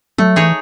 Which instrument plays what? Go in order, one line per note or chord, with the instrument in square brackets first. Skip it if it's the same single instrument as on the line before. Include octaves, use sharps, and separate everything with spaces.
[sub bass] F#3 [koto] A3
[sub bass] E3 [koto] D#4 G#4 C#5